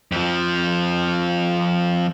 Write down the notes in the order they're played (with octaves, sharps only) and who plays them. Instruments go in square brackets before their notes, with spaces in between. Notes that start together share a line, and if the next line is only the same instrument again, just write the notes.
[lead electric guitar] F2 F3